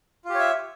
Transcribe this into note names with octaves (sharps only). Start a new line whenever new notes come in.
F4 G4 C#5 E5